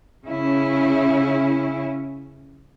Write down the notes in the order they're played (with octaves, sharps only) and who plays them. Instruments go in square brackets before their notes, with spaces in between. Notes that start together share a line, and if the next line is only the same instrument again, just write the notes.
[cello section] C#3 C#4 E4